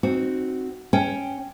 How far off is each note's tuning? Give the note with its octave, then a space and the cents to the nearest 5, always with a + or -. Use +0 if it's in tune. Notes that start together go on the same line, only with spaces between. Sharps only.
C4 +0 D#4 -15 F#4 +5
C#4 +0 G5 +0